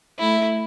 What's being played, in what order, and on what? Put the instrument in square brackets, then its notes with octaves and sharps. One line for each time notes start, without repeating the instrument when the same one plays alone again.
[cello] A3 [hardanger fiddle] E4